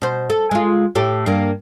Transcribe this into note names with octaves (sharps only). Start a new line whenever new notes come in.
B2 C5
A4
G#3 F4
A2 G4 A4
G2 A#3